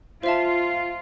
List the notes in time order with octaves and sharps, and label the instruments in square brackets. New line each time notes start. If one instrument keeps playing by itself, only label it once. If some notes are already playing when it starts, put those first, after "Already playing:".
[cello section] F4 [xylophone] C5 E5 A5